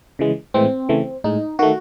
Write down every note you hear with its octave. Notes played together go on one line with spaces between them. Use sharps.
C#3 E3 G#3
A2 E3 G#3 C4
C#3 E3 A3
A2 G#3 D#4
D#3 A3 F#4